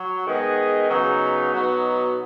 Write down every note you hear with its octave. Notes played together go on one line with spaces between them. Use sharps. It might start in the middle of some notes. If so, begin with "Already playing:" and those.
Already playing: F#3
G#2 D#3 B3 G#4 D#5
C#3 F#3 B3 D#4
B2 F#3 B3 D#4